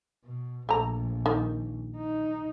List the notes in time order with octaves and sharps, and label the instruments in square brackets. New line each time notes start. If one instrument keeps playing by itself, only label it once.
[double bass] B2
[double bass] A#1 [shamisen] A3 A#5
[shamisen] D#3
[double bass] D#4